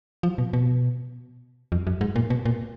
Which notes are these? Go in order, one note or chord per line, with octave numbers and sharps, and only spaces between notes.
F3
B2
B2
F2
F#2
G#2
A#2
B2
A#2